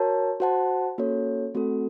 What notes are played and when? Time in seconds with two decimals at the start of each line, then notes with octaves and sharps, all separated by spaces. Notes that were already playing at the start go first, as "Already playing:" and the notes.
Already playing: F#4 A#4 C#5 A5
0.40 F#4 C5 F#5 A5
0.98 A#3 C#4 F#4 A4 C#5
1.55 A3 C4 F#4 A4